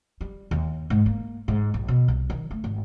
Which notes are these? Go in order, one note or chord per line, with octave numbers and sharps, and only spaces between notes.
G3
D#2
G#2
A#3
G#2
A#1
B2
C2
D#3
A3
G#1